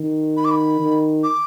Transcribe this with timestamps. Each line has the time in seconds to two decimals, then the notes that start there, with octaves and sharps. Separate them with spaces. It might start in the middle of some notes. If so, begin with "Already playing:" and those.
Already playing: D#3
0.37 B5
0.45 D6
0.51 B5
0.80 D#3
1.23 D6